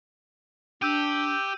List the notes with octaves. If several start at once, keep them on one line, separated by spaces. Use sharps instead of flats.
D4 G4 E6 G6 D#7